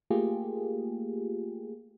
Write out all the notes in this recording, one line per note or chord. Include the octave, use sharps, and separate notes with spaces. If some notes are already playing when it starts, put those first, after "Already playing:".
A3 A#3 F4 G4 G#4